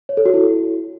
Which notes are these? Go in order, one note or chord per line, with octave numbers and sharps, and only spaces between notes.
C#5
A4
F#4
E4